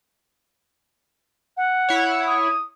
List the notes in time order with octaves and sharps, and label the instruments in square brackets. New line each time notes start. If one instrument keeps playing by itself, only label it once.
[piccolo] F#5
[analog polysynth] E4 C#5
[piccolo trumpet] D#6